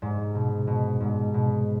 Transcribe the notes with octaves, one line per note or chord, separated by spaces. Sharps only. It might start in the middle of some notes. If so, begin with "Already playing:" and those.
G#2
B2
B2
G#2
B2